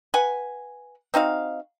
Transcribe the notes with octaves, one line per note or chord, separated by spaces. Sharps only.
B4 F#5 G#5
C4 D#4 F#4 F5